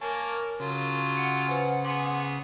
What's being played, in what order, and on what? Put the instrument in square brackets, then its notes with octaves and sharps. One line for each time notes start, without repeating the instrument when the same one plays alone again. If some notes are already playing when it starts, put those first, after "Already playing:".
[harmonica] A#3 C#5 [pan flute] A#4 [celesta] G#5 [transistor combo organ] A5
[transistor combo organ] C#3 [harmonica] F#3 F4
[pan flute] F#5 [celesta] C#7
[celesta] B4 C5 G#5 [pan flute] F#5
[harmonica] B3 G#4 [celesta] C6 D6 F#7